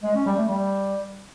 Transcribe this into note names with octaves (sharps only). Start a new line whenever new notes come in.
G#3
C#4
G3
A3
G3